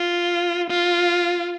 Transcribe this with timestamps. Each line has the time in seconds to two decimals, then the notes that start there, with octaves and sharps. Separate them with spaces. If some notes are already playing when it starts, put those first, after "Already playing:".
Already playing: F4
0.70 F4